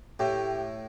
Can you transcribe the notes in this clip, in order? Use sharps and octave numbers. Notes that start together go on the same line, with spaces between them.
A2 G4